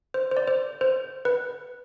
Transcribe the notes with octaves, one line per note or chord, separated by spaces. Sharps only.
C5
C5
D5
C5
C5
B4